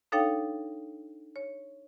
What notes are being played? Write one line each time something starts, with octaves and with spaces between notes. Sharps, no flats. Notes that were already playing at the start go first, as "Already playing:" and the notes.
D4 D#4 A4 C#5 F5 G5
C#5